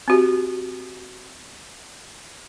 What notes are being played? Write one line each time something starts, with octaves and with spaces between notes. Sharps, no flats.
C4 F#4 G4